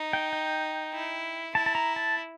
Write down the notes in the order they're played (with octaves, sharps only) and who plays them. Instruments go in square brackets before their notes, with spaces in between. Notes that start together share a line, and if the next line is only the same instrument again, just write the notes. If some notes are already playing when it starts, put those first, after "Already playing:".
Already playing: [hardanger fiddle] D#4
[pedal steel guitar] G5
G5
[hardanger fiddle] E4
[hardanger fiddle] E4 [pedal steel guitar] A5
[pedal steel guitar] A5
A#5
A5